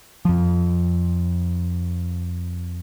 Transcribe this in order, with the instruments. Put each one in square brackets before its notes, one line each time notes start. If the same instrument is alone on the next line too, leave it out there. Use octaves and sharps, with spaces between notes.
[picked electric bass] F2 F3